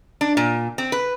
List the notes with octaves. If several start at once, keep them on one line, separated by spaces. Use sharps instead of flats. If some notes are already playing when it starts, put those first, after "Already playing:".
D4
A#2
C4
B4